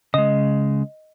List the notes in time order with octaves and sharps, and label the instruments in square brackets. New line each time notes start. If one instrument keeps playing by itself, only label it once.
[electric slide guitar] C#3 G#3 [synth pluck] D#5